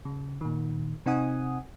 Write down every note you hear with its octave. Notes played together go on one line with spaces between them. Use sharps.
C#3
A#2 D#3
C3 C4 D#4 F#5 G#5 D#6